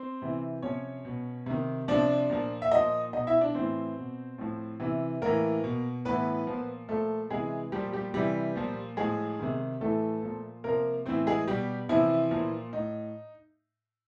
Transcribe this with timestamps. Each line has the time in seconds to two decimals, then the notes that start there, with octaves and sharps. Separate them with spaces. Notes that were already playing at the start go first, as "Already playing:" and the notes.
Already playing: C4 C5
0.22 C3 E3
0.62 C3 F3 C#4 C#5
1.05 B2
1.46 C3 D#3
1.88 C3 F3 D4 D5
2.30 A#2 F3
2.62 E5
2.72 A#2 F3 D#4 D#5
3.13 B2 D#4 D#5
3.27 E4 E5
3.41 D4 D5
3.55 A2 E3 C4 C5
3.97 B2
4.38 A2 F3
4.80 C3 E3
5.22 A2 E3 A#3 A#4
5.64 B2
6.05 A2 E3 B3 B4
6.47 A#2 F3
6.89 A#2 F3 A3 A4
7.30 C3 E3 G#3 G#4
7.72 A#2 F3 G3 G4
7.92 G3 G4
8.14 C3 E3 G3 G4
8.56 A#2 F3
8.97 A2 F3 G#3 G#4
9.39 C3 D#3
9.81 A2 E3 A3 A4
10.23 A#2 F3
10.64 C3 F3 A#3 A#4
11.06 A2 E3 C4 C5
11.27 G#3 G#4
11.47 B2 G3 G4
11.89 C3 E3 F3 E4
12.31 A#2 F3
12.73 A2 D#4